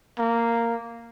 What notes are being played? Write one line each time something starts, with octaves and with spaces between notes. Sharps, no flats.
A#3